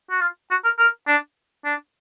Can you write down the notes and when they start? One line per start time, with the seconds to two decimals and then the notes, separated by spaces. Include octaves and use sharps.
0.11 F#4
0.21 F4
0.51 F#4
0.64 A#4
0.78 A#4
1.08 D4
1.65 D4